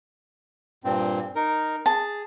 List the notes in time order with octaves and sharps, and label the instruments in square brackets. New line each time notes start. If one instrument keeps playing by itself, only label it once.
[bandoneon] G2 A#2 C4
D#4 A#4
[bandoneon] G#4 [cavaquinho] A5